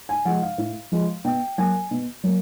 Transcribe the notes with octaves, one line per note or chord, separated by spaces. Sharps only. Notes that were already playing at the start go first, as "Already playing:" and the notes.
G#5
F3 G#3 F#5
F5
A2
F3 G#3
B2 G5
F#3 A#3 G#5
B2
F#3 A#3